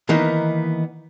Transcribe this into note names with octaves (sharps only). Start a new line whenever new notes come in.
D#3 E3 A#3 B3 D#4